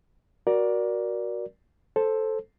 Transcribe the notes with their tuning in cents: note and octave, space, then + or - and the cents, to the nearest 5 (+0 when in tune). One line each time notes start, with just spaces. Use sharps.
F#4 +5 A#4 +25 D5 +0
A4 -5 C5 +10